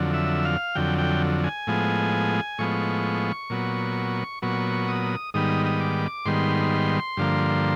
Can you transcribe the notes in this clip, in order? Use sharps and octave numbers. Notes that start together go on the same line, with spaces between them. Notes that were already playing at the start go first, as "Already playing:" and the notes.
Already playing: F2 D3 F#3
E5
F5
F2 D3 F#3 G5
G5
G#5
A2 F3 G#3 B3
A2 F3 G#3 B3 C#6
A#2 F#3 B3
A#2 F#3 B3 C#6
D#6
G#2 D#3 G3 B3 D#6
D#6
D6
G#2 D#3 G3 B3 C6
G2 D3 F3 A#3